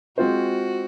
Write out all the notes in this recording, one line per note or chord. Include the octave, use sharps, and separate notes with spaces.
G#3 C4 F4 F#4 C5